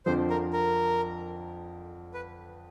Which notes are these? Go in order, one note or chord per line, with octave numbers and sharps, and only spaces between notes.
F2 D3 F3 C5
A#4
A#4
B4